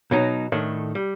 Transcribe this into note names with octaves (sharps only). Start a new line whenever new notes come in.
B2 F#3 D#4
A2 D#3 A3 D4
G3